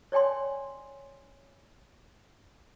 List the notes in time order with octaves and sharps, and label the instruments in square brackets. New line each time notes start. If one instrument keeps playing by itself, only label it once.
[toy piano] C#5 D5 G5 G#5 C6